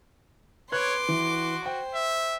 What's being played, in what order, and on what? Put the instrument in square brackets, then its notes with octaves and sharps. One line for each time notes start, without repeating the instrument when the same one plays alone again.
[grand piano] B4 F#6 G#6 [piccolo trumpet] C#5 [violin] C6 D6
[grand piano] E3 [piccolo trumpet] F#4
[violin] C5 [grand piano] G5
[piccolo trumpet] E5